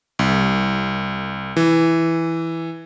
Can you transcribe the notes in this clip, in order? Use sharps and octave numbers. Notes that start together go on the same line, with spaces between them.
C2
E3